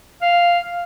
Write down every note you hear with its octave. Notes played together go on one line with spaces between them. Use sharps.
F5